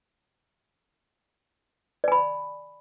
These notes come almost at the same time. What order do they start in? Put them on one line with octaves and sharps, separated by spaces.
D5 G#5 B5